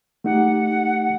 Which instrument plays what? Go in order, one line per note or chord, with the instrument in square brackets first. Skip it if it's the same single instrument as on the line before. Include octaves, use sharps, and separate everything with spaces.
[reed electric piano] A3 D#4 G4 [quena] F#5